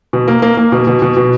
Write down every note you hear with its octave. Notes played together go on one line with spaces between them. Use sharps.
B2
A#3
A#3
A#3
B2
B2
B2
B2